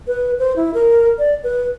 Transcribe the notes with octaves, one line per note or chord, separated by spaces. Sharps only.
B4
C5
E4
A#4
D5
B4